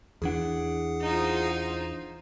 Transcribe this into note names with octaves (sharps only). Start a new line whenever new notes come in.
E2 E3 D4 G#4 F#5
D#4 F4 C5